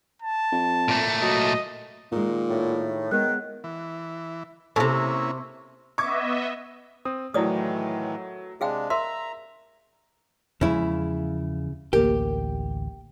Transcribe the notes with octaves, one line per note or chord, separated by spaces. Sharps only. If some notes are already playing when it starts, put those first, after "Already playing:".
A5
F2
A#2 A3
F#3 D#5
A#2 D#3 G#3
A2
D#3 G#3 B3 F#6
E3
A2 C3 A#3 C#4 E4
B3 D#5 E5 C#6 D6 G#6
C4 D#6
A2 D#3 E3 F#3 A3 E4 D5 D#6
C3 G#3 D4 G#4 F5 G5
A#4 E5 A#5 C6
E2 C#3 F3 G#3 E4
A1 D2 A#3 G4 A#4